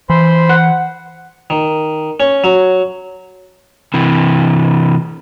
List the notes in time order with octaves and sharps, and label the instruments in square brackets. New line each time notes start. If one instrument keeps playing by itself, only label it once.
[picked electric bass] E3 [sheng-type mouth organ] C5 B5 C6
[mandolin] F#5
[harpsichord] D#3
C#4
F#3
[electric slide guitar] C3 E3